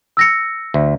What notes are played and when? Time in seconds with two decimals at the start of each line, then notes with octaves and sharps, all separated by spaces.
0.17 E6 A#6 C#7
0.74 D2